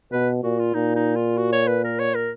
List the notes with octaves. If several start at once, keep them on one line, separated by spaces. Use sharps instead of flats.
B2 B4
A#2 F#4
F4
A#2 D#4
D#4
F4
F#4
C#5
B4
A#4
C#5
A#4